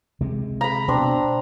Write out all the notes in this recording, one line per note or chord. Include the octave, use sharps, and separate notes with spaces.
C3 G#3
A#5 B5
B2 C4 D4